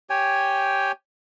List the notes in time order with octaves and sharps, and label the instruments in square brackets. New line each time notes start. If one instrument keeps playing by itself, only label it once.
[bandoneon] G4 C#5 G5 G#5